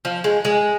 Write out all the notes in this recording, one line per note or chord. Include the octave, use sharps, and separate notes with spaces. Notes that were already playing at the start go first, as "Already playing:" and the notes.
F3
G#3
G#3